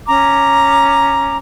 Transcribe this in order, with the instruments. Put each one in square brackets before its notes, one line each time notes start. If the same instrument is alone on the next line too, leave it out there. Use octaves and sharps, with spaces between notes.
[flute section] C#4 A#5 D6